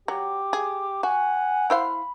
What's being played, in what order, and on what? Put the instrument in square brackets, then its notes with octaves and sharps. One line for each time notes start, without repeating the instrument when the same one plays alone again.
[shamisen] F#3 [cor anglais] G4
[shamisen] G#4
[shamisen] F#4 [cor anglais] F#5 [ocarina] G#5
[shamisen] E4 C5 F5 [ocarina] B5